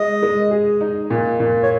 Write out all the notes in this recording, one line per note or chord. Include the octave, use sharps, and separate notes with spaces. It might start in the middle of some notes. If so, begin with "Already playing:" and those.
Already playing: G#3 D#5
G#3
G#4
D#4
A#2
A#2
C#5